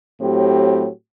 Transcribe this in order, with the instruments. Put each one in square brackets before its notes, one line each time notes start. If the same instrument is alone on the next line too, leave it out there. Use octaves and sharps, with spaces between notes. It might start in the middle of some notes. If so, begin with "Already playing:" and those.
[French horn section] A2 F#3 C4 G4